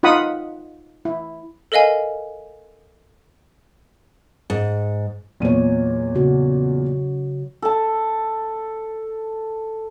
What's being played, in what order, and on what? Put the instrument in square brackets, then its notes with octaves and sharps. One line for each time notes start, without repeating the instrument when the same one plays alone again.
[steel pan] D#4 F4 F#5 B5 D#6
E4
[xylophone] A4 A#4 D#5 F5 G#5
[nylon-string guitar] G#2
[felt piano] E2 A#2 D#7 [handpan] F#3 C#5
[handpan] C#3 F#4
[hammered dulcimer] A4 A5